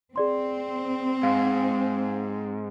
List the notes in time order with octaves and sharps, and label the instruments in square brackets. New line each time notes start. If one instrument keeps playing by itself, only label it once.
[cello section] C4 [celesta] G#4 D5 C6
[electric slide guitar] G#2 [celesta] F5